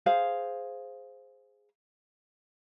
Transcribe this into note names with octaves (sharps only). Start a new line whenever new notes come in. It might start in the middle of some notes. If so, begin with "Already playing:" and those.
G#4 C5 F5